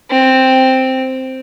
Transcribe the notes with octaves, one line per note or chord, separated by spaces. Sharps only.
C4